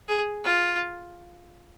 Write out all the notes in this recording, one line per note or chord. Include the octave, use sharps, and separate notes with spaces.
G#4
F4